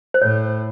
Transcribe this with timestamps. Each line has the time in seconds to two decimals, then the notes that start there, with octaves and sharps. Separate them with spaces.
0.14 C5
0.22 A2 C#5